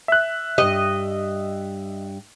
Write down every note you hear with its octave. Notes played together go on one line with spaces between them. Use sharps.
E5 F#6
G2 G4 D#5